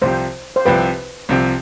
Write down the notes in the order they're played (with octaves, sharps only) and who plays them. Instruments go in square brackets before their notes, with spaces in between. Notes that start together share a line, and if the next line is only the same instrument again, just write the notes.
[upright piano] C2 C3 F3 C4 G4 [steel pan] C5
[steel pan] C5
[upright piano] C2 C3 F3 C4 G4 [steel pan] B4
[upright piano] C2 C3 F3 C4 G4